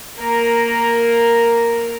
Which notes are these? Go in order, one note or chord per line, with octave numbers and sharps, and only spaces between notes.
A#3 A#4